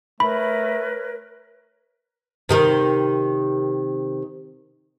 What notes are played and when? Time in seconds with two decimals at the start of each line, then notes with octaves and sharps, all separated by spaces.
0.20 A3 A#4 B4 C#5 B5
2.49 C3 D#3 A#4